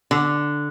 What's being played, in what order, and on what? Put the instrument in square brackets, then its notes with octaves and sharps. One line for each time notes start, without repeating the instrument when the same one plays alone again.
[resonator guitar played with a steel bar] D3